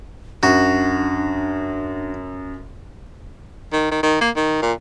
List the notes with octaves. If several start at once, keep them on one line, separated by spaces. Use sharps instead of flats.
F#2 D4 F#4
D#3
D#3
D#3
A#3
D#3
A#2